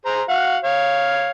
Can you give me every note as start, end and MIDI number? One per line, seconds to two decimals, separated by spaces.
0.06 0.22 68
0.06 0.22 72
0.06 0.22 82
0.29 0.57 66
0.29 0.57 77
0.29 0.57 78
0.64 1.31 73
0.64 1.31 77